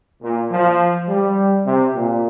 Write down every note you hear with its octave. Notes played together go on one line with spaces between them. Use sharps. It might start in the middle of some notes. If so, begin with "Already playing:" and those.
A#2
F3
G3
C3
A#2